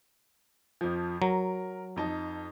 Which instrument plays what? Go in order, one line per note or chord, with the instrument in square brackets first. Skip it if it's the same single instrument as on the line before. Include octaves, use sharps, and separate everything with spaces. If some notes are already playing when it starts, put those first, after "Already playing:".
[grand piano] F2 F3
[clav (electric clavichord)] F#3 [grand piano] A#4
[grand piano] F2 D#4 A5